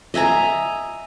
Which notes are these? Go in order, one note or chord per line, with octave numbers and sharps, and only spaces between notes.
D#5 E5 G#5 A#5